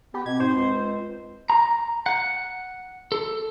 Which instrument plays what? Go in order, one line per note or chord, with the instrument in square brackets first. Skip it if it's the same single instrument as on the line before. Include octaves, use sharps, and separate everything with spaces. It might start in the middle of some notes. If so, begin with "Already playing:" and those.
[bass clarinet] B3 [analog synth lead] G4
[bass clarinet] B2 [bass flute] C4 [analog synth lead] G#6
[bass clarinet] G#2 [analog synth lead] C5
[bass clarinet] C#2
[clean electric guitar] A#5
F#5
A4